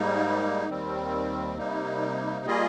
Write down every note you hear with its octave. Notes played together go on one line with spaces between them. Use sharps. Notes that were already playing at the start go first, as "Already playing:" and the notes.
Already playing: G#2 G3 A#3 D#4
D#2 D#3 G3 C4
C3 G3 A#3 D#4
G3 A#3 F4 G#4 D#5